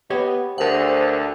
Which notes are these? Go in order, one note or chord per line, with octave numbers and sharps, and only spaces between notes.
B3 G4 C#5 D#5
D2 A#4 C5 F#5